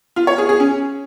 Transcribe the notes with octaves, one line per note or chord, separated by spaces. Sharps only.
F4
C#5
G#4
G#4
C#4